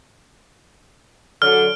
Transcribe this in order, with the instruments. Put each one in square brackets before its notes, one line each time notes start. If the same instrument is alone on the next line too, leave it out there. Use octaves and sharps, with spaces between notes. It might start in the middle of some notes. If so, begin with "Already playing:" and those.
[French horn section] D3 F#3 [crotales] F6